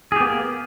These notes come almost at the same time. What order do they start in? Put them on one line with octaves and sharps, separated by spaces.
G#4 G4 B3 A#3